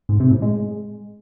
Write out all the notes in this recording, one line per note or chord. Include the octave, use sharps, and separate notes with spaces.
G#2
C3
A2
G#3